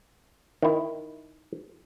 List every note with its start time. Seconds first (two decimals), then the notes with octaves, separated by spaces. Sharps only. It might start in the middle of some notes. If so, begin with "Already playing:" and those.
0.62 D#3 E4